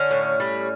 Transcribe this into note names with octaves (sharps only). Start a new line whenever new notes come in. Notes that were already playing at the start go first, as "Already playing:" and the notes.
Already playing: D3 C#4
A2
G3